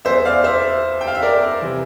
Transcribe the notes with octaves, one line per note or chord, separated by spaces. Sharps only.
E2 E3 C5 E5
D5 F5
C5 E5
G5
F5
E5
A#4 D5
C3 E3